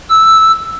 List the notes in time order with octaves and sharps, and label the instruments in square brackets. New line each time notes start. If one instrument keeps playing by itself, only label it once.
[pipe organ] E6